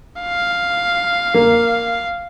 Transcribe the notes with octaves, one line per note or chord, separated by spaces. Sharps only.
F5
A#3